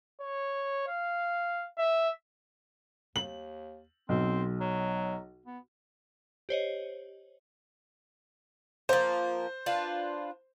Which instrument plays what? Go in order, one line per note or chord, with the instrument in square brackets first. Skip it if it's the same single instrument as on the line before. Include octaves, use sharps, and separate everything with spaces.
[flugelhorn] C#5
F5
E5
[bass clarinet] D#2 [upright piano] F#7
[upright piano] B1 [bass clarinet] C4
[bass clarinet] F#3
B3
[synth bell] G4 C5 C#5 D#5
[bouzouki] F3 A#3 [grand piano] C5
[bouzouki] D4 F4 B4